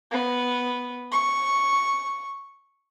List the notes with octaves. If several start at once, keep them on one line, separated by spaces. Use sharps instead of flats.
B3
C#6